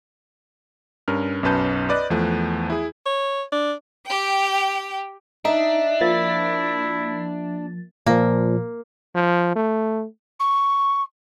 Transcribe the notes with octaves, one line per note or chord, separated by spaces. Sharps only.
G2 C#4 A#4 F6
B1 F#2 C#4 B4 A5 G6
B4 D5 D#5 F#6
E2 F3 A3
E4 G#4
C#5
D4
G4 G5
D4 D#4 E5
F3 A#3 E4 A6
A#2 F3 A#3
F3
A3
C#6